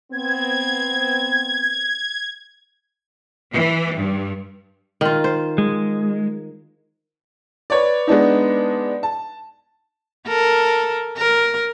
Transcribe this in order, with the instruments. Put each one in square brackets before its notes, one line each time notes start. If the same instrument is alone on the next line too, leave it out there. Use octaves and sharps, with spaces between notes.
[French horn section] B3 C4 [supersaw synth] G#6
[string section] E3
G2
[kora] D#3 F4
C5
[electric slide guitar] G#3
[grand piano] B4 C#5 D5
G#3 B3 D4 D#4
A5
[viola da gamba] A4 A#4
A#4